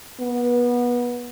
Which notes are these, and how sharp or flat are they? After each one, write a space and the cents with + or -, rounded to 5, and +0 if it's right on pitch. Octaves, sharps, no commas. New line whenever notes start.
B3 -25